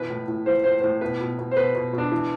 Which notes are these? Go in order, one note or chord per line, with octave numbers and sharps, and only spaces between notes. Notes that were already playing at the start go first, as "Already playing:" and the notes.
Already playing: B2 E3 B4
A2
A2
E3 C5
A2 C5
A2 C5
B2 B4
B2
B2
C5
B2 B4
B2
B2
D4
E3